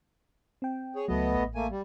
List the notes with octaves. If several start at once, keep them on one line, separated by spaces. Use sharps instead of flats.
C4 G5
G#4 C#5
C#2 F#3 A3 B3 D#5
A1
A3 A#3 G#5
G3